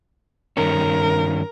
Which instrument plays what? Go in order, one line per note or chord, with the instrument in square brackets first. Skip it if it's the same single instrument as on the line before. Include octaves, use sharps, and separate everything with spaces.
[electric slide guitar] G2 D#3 C#4 [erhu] A#4